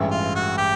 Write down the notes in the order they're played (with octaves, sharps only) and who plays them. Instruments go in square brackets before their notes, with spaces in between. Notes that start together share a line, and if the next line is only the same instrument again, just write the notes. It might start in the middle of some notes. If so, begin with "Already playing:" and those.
Already playing: [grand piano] A1 G2 E3 G#3
[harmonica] F4
F#4
G4